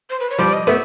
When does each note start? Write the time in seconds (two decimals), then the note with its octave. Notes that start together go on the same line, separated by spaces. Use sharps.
0.10 C5
0.20 B4
0.30 C#5
0.39 F3 G3 D5
0.53 D#5
0.67 A3 B3 E5